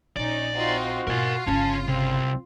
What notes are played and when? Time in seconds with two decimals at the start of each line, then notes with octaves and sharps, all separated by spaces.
0.16 A#1 C#4 D#4 D5
0.56 C4 D#4 F4 F#4
1.07 B2 F4 A#4 G#5
1.47 G1 C#3 C#4 A5
1.88 C2 C4